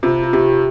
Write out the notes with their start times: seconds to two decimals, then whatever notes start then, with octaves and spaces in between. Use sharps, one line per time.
0.03 C3 F4
0.24 F4
0.33 C3 G4